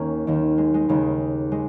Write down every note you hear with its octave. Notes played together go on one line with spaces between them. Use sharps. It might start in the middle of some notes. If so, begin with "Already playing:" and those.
Already playing: D#2 D#3 A#3 C#4
D#2 D#3
G#3
G#3
D#2 C#3 G#3
G#3